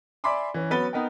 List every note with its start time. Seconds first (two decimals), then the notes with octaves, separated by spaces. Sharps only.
0.24 D5 E5 G#5 B5 C6 D6
0.54 E3 C#4
0.70 F#3 B3 C#4 B4 A6 G7
0.93 B3 D#4 A#4 G5